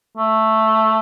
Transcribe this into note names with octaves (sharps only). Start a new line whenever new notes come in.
A3